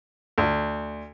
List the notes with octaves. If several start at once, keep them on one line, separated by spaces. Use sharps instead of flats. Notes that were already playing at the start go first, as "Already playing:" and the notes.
D2